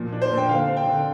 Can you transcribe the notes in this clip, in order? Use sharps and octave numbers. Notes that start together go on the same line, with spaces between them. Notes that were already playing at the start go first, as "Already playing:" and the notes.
Already playing: A#2 F3
D4
C5
A#2
G5
D3 F5
C4
G5
D3